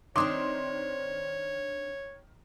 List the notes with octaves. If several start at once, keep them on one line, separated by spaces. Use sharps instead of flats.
D#3 C4 D4 D#4 C#5 C6 D6 D#6